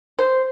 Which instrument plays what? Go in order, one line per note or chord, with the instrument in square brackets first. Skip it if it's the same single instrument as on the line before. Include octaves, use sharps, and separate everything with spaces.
[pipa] C5